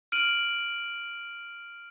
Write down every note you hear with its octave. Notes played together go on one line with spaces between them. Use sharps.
F6 D7 D#7 F#7